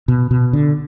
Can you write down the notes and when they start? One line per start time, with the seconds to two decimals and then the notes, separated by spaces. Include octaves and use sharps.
0.08 B2
0.31 B2
0.53 D3